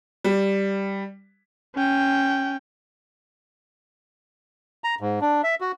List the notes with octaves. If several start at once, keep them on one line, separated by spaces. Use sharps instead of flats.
G3
C#4 G5
A#5
G#2
D4
E5
F#4